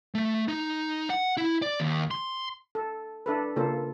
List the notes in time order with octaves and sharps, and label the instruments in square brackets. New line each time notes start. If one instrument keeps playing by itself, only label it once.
[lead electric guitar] A3
D#4
F#5
E4
D5
D#2
C6
[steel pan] A4
D4 A4 B4
C#3 A#3 F4 A4